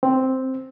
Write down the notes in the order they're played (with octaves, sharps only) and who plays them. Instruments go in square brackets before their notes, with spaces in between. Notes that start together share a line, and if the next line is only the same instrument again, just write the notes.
[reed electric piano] C4